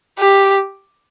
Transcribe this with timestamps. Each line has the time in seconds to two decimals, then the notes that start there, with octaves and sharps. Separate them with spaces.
0.19 G4